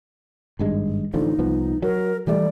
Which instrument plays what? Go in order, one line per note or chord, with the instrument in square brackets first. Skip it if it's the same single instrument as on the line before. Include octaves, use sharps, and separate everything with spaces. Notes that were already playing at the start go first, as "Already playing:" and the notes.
[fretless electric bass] G#1 G2 G#3
[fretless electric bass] A1 D3 F3 [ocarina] D#4
[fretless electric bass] C2 F3 B3
[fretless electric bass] F#3 [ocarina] A#4
[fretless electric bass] E3 G3 A3 [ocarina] D5